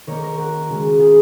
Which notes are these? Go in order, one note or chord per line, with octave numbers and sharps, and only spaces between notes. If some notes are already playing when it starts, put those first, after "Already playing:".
D#3 A#3 A#4 C#5
A#4 C#5
F#4 A#4
C#3 G#3
F4 G#4